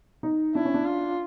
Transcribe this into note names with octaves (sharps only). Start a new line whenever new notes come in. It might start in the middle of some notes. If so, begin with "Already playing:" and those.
D#4
D4 E4
C#4
D4
F4